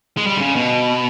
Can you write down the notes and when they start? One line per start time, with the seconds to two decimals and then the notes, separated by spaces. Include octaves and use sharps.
0.17 G#3
0.27 G3
0.37 D3
0.41 C#3
0.56 B2